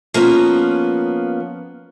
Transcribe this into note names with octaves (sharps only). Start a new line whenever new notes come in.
F3 A#3 B3 C#4